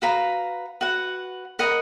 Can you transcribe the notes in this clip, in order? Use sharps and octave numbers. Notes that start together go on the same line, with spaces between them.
F#4 B4 F5 A#5
F#4 B4 F#5
A#4 D#5 F#5 B5